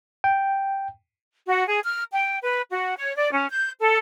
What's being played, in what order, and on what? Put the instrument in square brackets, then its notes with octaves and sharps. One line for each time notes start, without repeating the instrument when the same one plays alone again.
[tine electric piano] G5
[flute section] F#4
G#4
F6
G5
B4
F#4
C#5
D5
C#4
G6
A4